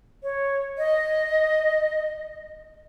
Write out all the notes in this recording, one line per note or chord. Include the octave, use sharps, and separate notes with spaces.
C#5
D#5